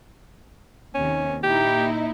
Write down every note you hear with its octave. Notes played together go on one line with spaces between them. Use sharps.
D#2 C3 D#3 C#4
A#2 D#4 E4 G4